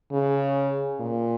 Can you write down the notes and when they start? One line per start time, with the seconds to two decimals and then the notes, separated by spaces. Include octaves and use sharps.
0.12 C#3
1.00 A#2